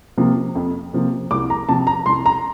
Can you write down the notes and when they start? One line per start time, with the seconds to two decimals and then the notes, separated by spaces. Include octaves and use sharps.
0.18 C3 F3 A#3
0.55 F2
0.93 C3 F3 A#3
1.31 C2 D6
1.50 A#5
1.69 C3 F3 A5
1.87 A#5
2.06 C2 C6
2.26 A#5